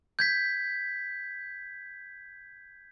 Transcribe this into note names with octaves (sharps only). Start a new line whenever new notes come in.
G6 G#6 B6